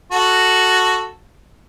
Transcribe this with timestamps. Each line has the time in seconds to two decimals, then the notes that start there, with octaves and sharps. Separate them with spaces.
0.12 F#4 A4